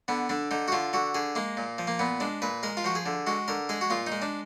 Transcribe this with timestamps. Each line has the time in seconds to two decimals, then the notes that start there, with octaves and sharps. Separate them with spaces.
0.08 D3 B3
0.29 D3 D4
0.51 D3 D#4
0.68 F#4
0.72 D3 F4
0.93 D3 F#4
1.14 D3 G#4
1.35 G#3 A#3
1.57 A#2
1.78 F3
1.87 A#3
1.99 A#2 B3
2.20 G#3 D4
2.42 A#2 B4
2.63 G#3 A#4
2.77 F4
2.84 F3 F#4
2.95 G#4
3.06 D3
3.27 G#3 F#4
3.48 D3 A#4
3.69 G#3 G#4
3.81 F#4
3.90 A#2 F4
4.07 D#4
4.12 G#3
4.22 D4